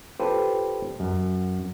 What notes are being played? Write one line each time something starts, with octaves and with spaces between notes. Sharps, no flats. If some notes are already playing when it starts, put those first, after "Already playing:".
F4 G4 A4 B4 C5
F#2